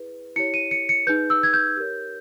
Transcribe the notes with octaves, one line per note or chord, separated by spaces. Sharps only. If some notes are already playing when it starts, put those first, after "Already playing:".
Already playing: E4 G#4 B4
E4 G4 C#5 C#7
D#7
C#7
C#7
D#4 G#4 B4 G6
E6
G#6
G6
G4 A#4 C#5